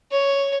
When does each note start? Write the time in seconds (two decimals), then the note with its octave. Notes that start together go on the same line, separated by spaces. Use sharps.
0.11 C#5